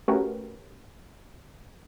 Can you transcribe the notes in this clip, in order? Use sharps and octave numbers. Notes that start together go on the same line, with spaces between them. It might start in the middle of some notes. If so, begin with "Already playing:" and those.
A3 C#4 F#4 G4 A#4 B4